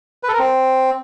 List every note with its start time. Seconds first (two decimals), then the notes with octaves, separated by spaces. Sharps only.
0.23 B4
0.29 A4
0.34 A#4
0.39 C4